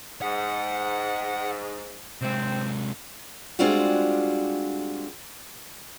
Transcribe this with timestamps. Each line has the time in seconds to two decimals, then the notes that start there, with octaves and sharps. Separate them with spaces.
0.22 G#2 F#5
2.21 C3 G#3 C4
3.59 G3 G#3 C4 D4 F4 F#4